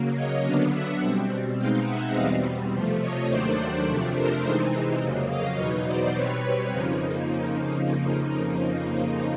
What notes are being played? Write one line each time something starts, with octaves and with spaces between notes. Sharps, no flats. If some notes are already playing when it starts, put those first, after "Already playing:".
Already playing: C#3 F#3 A#3
C#5 D#5
D3 F#3 B3 D4 D#5 F5
E5 F#5
B2 G3 C4
B2 G#3 C4 D#4 F5 G5
E5 F#5
E2 B2 G3 C4 D#5 F5
C3 F3 A3
C#5 D#5
D#2 D#3 F#3 A3 D4 C5 D5
F2 C3 F3 A3 D4
A#4 C5
C3 E3 G#3 C4 D#4
F2 C#3 F#3 A#3
D#5 F5
E2 B2 F#3 B3 D#4 C#5 D#5
C5 D5
B2 G3 C4 B4 C#5
F2 C#3 F3 A#3 D#4